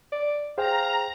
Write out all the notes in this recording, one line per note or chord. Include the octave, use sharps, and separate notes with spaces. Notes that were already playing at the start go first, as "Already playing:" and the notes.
D5
G#4 C5 F5 G5 A#5